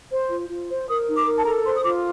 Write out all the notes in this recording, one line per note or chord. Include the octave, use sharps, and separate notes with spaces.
C5
F4
F4
C5
A#4 D#6
D#4
D6
A#4
A5
A4 A#5
C5 C6
D#6
F4 D6